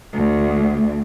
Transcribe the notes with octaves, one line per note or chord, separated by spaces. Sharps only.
D2